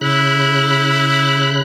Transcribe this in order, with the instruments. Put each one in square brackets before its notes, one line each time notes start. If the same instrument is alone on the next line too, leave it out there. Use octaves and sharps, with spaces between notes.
[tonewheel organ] C#3 B5 F#6 [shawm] E4